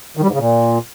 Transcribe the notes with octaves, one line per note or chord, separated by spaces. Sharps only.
D#3
G3
G#2
C#3
A#2